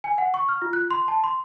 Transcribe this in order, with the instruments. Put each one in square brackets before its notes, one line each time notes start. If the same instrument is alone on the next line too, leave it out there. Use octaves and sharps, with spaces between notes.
[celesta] G#5
F#5
C#6
F6
F4
F#6
C6
A5
C6